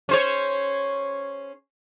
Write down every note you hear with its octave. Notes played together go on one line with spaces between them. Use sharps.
C#4 C5 C#5